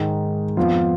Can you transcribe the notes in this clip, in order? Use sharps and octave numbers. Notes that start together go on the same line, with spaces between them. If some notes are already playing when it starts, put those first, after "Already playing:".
Already playing: G#2 D#3 G#3
F2 F3 B3 F4